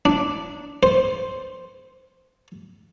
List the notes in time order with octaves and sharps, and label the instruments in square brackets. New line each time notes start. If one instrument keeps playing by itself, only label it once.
[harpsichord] D4
C5